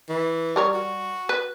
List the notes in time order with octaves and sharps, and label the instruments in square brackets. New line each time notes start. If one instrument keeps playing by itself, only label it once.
[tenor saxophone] E3
[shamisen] G3 A#4 C#5
[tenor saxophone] F#4
[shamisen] B4